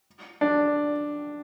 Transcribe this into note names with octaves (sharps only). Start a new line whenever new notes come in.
D4